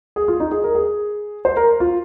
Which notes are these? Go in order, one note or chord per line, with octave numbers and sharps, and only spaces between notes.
G#4
F4
D#4
G#4
A#4
G#4
C5
A#4
F4